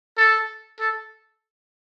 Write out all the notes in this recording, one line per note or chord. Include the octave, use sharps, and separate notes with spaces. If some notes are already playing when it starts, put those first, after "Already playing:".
A4
A4